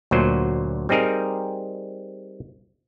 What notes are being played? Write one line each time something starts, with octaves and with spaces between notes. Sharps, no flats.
D2 A#2 F#3 C5
G3 C4 D#4 G#4 A#4